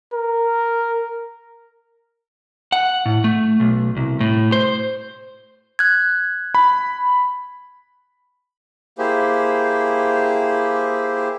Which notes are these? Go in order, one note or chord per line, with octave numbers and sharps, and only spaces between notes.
A#4
F#5
A2
A3
B1
C2
A2
C5
F#6 G#6
B5
A#3 E4 G4 G#4 C5